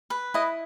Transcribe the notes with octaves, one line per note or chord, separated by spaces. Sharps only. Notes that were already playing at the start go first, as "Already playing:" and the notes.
B4
E4 D#5